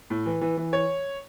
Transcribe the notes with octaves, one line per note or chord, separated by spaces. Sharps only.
A2
E3
E3
E3
C#5